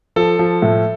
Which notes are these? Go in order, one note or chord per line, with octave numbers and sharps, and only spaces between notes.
F3 A4
F3
A2